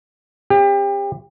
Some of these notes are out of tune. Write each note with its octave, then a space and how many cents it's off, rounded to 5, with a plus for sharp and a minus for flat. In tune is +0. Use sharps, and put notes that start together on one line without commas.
C4 +40 G4 +30